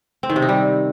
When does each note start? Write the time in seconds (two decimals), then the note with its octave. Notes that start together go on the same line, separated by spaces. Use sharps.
0.23 C4
0.30 D#3
0.36 C3
0.42 D#4
0.49 G3